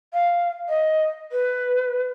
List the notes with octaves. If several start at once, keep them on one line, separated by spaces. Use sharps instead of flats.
F5
D#5
B4